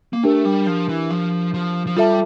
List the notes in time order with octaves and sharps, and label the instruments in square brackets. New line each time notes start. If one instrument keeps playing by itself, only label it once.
[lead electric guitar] A#3
[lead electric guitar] A3 [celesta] D4 G4 A#4
[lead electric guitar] G3
F3
E3
F3
F3
F3
[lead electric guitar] G3 [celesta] F4 A4 E5 A5